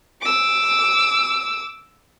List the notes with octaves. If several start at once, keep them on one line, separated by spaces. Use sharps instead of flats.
D6 E6